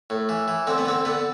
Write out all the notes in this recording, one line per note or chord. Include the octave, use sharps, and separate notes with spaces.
A2
E3
E3
D3 C4
B3
D3 C4
D3 B3